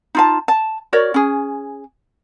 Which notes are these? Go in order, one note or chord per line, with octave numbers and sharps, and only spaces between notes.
D#4 F4 A5
A5
F#4 A#4 C#5 D5
C#4 G#4